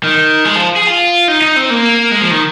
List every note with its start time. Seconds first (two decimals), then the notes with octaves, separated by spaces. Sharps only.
0.04 D#3
0.45 G#3
0.56 F3
0.76 G#4
0.87 F4
1.28 D#4
1.42 D#4
1.56 C4
1.70 A#3
2.11 G#3
2.22 F3
2.31 D#3